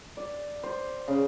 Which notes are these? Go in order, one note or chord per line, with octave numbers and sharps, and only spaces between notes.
D5
C5
C#3